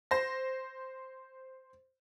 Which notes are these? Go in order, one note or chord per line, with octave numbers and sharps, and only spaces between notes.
C5 A#6